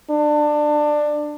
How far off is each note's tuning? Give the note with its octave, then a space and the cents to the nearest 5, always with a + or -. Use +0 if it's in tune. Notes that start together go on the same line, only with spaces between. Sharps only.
D4 +20